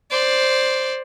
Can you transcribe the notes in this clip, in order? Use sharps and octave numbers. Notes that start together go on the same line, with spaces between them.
C5 D5